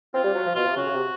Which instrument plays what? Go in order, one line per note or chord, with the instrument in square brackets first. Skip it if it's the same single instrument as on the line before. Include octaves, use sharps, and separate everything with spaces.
[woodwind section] C4 [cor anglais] F4
[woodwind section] G3
F#3
F3
[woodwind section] B2 [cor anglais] F4
[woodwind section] C3
[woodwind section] C#3 [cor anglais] F#4
[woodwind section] C#3
C3